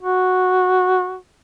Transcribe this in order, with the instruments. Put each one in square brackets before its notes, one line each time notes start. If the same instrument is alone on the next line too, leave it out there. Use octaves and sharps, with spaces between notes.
[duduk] F#4